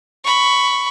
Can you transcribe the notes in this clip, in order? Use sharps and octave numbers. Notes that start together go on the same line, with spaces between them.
B5 C#6